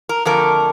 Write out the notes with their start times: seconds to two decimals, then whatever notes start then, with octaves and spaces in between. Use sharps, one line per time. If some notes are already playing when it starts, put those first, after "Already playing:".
0.09 A#4
0.25 F2 D3 A3 A#4